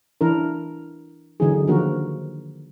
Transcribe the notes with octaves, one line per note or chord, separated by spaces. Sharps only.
E3 D4 E4 A#4
D3 E3 F#3 B3 D#4 G#4
D#3 F3 A#3 D4 F#4 A#4